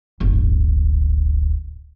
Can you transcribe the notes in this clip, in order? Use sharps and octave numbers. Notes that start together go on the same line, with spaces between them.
D1 G1